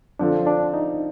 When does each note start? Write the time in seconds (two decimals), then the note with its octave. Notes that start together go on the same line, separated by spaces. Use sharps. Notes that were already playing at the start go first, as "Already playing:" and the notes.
0.19 D3 F3 C4 D4 F4 A4
0.47 D4
0.74 D#4